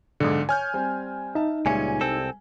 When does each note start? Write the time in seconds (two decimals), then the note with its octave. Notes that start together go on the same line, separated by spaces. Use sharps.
0.20 B1 G#2 D3 D5 D#6
0.49 C#5 G#5 F6 G6
0.74 G3 C4
1.35 D#4 E5 A5
1.66 C#2 A#2 G3 G#3 C#4 E5 G#5
2.01 C2 C4 A4